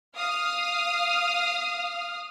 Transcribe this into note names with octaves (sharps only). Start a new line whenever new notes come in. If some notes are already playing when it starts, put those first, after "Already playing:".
F5 D#6 F6